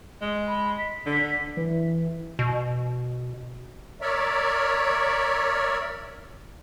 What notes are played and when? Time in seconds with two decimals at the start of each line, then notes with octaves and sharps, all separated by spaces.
0.22 G#3
0.48 B5
0.78 B6
1.06 D3
1.57 E3
2.39 B2
4.01 A#4 C#5 D5 E5